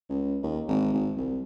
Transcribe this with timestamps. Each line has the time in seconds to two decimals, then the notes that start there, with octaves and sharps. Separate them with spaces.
0.09 C#2
0.43 D#2
0.68 G#1
0.93 G#1
1.17 C2